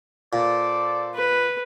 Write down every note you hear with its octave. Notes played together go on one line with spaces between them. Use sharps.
A#2 A4 C5 D5
B4